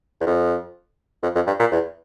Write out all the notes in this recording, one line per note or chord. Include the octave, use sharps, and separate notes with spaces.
E2
F2
F2
F2
G2
A#2
E2